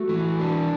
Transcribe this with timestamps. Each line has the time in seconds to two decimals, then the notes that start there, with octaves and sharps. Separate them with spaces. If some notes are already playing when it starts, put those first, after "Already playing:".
Already playing: A3 F#4
0.09 E3
0.39 D4